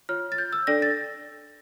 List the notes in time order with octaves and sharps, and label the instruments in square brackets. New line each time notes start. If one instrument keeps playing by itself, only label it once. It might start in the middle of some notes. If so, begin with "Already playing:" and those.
[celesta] F4 C#5 F6
A6
G6
E6
D4 A4 D5 A#6
A6